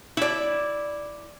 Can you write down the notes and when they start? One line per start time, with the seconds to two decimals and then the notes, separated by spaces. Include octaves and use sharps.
0.17 E4 D5